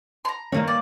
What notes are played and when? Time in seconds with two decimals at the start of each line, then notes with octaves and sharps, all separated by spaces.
0.25 A#5 C6
0.52 G2 D#3 A#3 C#5
0.68 D5